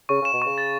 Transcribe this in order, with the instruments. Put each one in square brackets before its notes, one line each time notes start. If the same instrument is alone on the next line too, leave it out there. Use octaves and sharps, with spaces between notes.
[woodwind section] C#3 [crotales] C#6
[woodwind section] C#3 [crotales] E7
[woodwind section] B2
[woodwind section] C#3 [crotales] C#6
[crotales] A6